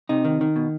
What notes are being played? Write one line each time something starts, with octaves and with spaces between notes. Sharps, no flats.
C3 D#4
D#3
D#3
B2